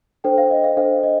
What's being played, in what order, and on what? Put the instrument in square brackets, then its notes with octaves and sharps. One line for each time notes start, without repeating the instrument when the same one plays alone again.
[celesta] D4 A4 C5 G5
F5
D#5
F5
D4 A4 C5 F5
D#5